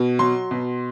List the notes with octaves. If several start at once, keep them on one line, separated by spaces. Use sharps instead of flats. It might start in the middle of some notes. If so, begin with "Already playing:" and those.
Already playing: B2
F#3 C6
B2